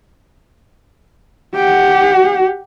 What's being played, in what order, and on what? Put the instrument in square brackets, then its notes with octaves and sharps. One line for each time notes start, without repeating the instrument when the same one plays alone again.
[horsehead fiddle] G4 F#5